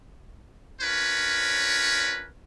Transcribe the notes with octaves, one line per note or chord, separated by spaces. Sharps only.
C#4 D4 F4 A#4 B4 C#5